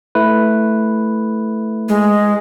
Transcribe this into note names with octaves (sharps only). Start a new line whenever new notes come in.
A3 E4 B4
G#3